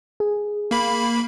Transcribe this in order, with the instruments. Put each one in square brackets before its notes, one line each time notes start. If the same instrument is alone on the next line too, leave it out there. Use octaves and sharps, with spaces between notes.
[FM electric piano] G#4
[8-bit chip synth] A#3 B5